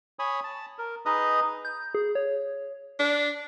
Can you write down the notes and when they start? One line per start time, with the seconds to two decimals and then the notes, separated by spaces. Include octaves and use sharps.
0.19 C#5 G#5 B5 D#6
0.44 A5
0.78 A#4
1.06 D#4 G#4 B4 D#5 A#5 D#6
1.65 G6
1.95 G#4
2.15 C#5
2.99 D4